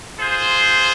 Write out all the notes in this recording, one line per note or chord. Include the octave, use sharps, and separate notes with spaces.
F4 G#4 C5